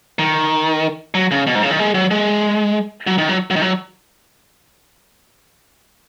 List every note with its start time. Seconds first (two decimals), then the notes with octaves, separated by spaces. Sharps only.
0.19 D#3
1.14 F#3
1.31 C#3
1.47 B2
1.55 G#2
1.63 C#3
1.71 D#3
1.79 G#3
1.94 F#3
2.11 G#3
3.07 F#3
3.18 D#3
3.29 F#3
3.50 F#3
3.56 D#3
3.62 F#3